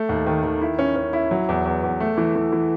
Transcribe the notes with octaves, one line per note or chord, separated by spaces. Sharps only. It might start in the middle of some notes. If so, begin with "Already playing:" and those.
Already playing: A3
D#2
D#3
D#3
E4
C#4
C#4
E4
F#3
E2
E2
E2
A3
E3
E3
E3